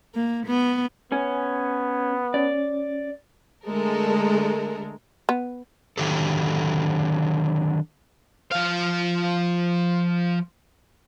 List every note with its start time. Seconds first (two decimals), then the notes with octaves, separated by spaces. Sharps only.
0.15 A#3
0.47 B3
1.12 B3 C#4 G#5
2.34 C#4 D5
3.66 D3 G#3 A3 A4 A#4
5.29 B3
5.98 D3 D#3 F#3 G4 A4
8.52 F3 F5